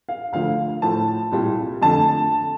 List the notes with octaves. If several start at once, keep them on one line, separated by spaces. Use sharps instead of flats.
F5
D2 D3 F3 A3 F5
A2 F3 A3 A5
C2 A#2 G3
F2 D3 A3 A5